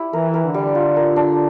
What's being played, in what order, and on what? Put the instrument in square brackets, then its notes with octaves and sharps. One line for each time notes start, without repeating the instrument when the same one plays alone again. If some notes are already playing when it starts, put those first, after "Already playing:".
Already playing: [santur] E4 G4
[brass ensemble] E3 [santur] A#4
[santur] A#4
[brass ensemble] D3
[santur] G3
F4
A#4
D4